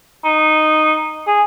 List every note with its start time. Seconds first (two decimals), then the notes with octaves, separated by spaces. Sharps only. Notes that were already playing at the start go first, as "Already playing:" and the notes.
0.25 D#4
1.27 G#4